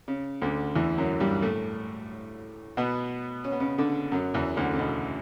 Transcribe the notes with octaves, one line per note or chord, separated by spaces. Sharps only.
C#3
D2 D3
E2 E3
F#2 F#3
G2 G3
A2 A3
B2 B3
C#4
B3
C#3 C#4
D3 D4
F#2 F#3
E2 E3
D2 D3
C#3
B2